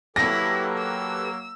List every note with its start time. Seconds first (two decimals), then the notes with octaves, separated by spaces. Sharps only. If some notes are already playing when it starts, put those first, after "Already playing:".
0.16 F#3 A#3 E4 G4 A4 B4 A#6
0.78 E6